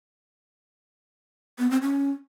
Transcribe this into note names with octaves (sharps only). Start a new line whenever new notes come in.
B3
C4
C#4